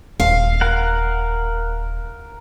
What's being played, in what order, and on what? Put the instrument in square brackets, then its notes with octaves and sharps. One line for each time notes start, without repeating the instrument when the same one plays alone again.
[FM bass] D#1 [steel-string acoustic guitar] F5
[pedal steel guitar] A#4 F#5